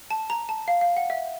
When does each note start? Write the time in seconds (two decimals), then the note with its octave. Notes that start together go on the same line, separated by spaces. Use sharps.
0.11 A5
0.30 A#5
0.49 A5
0.68 F5
0.81 F5
0.97 F#5
1.10 E5